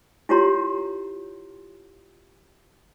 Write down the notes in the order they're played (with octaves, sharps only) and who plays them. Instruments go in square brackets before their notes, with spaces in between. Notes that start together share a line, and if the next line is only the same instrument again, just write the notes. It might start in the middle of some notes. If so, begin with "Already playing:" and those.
[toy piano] E4 F4 G4 C#5 A#5 C6